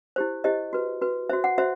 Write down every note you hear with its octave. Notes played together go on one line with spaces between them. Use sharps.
E4 G4 C5
E4 G4 C5 D#5
F#4 B4
F#4 B4
F#4 C5 E5
F#5
F#4 C5 E5